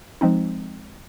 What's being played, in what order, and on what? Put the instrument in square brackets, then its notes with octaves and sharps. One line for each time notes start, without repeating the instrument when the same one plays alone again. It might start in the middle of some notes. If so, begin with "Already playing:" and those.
[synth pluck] F3 G#3 C4 D#4